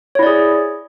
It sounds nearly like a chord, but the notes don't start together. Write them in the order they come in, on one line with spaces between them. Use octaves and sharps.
C#5 E4 D5 G#4